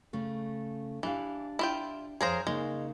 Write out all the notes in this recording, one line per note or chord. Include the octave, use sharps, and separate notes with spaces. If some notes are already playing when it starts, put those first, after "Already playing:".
C#3 A3 C#4
E3 D4 G4 F5
E4 F4 G5
F2 G#4 A#4 C5 C#5 F5
C#3 G#3 A#3 D#4